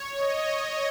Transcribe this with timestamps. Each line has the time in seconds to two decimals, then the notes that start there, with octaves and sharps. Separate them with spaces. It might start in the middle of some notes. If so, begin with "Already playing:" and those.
Already playing: C#5
0.17 D#5